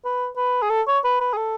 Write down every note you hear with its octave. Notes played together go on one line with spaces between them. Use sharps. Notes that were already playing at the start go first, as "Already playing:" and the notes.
B4
B4
G#4
A4
C#5
B4
B4
G#4
A4